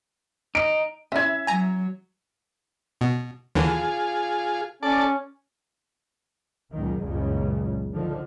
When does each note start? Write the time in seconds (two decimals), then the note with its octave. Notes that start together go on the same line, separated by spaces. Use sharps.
0.55 D#4 D7
1.12 C#4 E4 E5 G#6
1.47 F#3 G#5 A#5
3.01 B2
3.55 D#2 D3 E3 F4 G#4
4.83 C#4 A4 D5 A5
6.73 C#2 F#2 A#2 D#3
7.02 F#1 C#2 G2 A#2 C#3
7.93 D3 D#3 F3